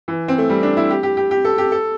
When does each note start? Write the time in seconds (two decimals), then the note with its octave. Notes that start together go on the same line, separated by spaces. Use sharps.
0.08 E3
0.28 C4
0.38 A3
0.49 G3
0.63 D4
0.77 E4
0.91 G4
1.03 G4
1.17 G4
1.31 G4
1.45 A4
1.58 G4
1.72 A4